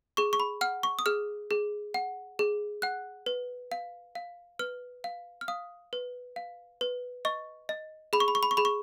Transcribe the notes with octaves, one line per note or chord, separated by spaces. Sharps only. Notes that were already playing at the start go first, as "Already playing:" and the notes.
G#4 C#6
C#6
B5
F#5 F6
C#6
D#6
G#4 F6
G#4
F#5
G#4
F#5 F#6
B4
F5
F5
B4 F6
F5
F6
F5 D#6
B4
F5
B4
D#5 C#6
D#5
G#4 B5
C#6
B5
C#6
B5
C#6
G#4 B5
C#6